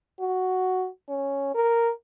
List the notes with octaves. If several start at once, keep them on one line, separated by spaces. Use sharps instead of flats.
F#4
C#4
A#4